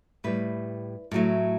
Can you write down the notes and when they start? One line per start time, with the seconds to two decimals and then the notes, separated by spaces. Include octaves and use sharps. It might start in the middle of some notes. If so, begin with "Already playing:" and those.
0.24 A2 G3 B4
1.11 A2 F#3 A3